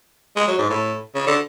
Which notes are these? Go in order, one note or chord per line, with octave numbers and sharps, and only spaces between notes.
G#3
F#3
G#2
A2
C#3
D3